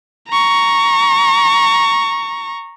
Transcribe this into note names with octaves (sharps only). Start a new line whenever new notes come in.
A#5 C#6